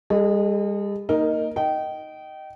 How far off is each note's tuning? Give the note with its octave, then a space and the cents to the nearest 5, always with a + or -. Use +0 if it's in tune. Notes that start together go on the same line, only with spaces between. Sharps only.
G3 +45 A4 -15 D#5 -15
A#3 -20 D#4 +0 A#4 +5
D#5 +0 G5 -25